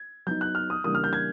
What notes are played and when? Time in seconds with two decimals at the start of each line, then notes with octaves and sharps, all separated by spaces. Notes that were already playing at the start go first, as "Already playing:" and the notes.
Already playing: G#6
0.26 F#3 B3 D#4 G6
0.41 F#6
0.55 F6
0.70 D#6
0.84 C#3 E3 G3 A#3 D4 D#6
0.95 F6
1.04 G6
1.13 G#6